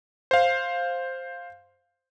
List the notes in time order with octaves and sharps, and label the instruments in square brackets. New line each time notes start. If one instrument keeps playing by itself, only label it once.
[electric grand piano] C5 F5